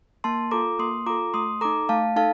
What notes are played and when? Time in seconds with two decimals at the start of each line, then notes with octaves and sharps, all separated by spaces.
0.24 A#3 A5 C6
0.51 F4 A4 A#5 D6
0.79 A#3 C6 D#6
1.06 F4 A4 A#5 D6
1.34 A3 C6 D#6
1.61 D#4 A4 A#5 D6
1.89 A3 F5 A5
2.16 D#4 A4 F5 A5